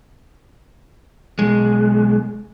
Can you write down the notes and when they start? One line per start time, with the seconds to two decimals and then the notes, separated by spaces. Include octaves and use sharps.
1.39 B1 G#3